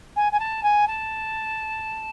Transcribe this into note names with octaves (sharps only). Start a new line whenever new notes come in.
G#5
G#5
A5
G#5
A5